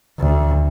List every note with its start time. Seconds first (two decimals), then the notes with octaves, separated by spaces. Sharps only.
0.19 D2